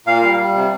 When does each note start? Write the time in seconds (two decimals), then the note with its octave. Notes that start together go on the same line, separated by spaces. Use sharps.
0.06 A#2 F5
0.23 G3
0.38 G3
0.55 C3